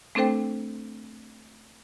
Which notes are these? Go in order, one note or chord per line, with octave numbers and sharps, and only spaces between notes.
A3 C4 D4 A4 C5 G5